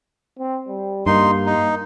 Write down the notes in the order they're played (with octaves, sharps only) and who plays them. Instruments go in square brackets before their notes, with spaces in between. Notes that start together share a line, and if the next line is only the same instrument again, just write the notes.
[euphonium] C4
G3
[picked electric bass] G2 [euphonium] A#3 [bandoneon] D#4 C6
[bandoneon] D#4